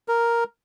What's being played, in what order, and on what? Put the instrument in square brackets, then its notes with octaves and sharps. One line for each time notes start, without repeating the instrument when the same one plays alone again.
[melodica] A#4